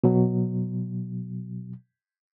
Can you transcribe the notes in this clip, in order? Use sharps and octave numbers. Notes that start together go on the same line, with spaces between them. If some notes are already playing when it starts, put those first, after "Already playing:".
B2 F#3